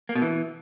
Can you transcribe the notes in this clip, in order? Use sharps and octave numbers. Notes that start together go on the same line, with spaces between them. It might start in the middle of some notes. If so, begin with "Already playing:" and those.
A#3
B2
E3